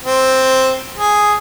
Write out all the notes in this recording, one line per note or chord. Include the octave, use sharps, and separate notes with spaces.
C4
G#4